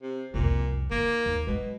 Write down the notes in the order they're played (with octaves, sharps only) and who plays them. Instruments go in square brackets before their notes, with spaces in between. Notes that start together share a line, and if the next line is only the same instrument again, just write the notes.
[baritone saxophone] C3
[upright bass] C2 F2 [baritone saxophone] A#2
[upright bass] D#3 [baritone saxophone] A#3
[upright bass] D#2
[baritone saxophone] B2 [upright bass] F#3 G#3